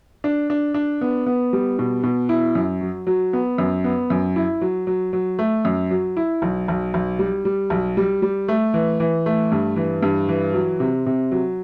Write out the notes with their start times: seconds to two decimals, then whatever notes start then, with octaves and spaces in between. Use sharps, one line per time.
0.24 D4
0.50 D4
0.74 D4
1.01 B3
1.26 B3
1.53 G3
1.79 B2
2.03 B2
2.29 E4
2.55 F#2
2.81 F#3
3.07 F#3
3.33 B3
3.58 F#2
3.84 B3
4.10 F#2
4.36 E4
4.61 F#3
4.87 F#3
5.13 F#3
5.39 A3
5.65 F#2
5.91 F#3
6.17 E4
6.42 B1
6.68 B1
6.94 B1
7.19 G3
7.45 G3
7.70 B1
7.97 G3
8.22 G3
8.48 A3
8.74 E3
9.00 E3
9.26 A3
9.52 G2
9.76 E3
10.03 G2
10.28 E3
10.54 F#3
10.80 C3
11.06 C3
11.31 F#3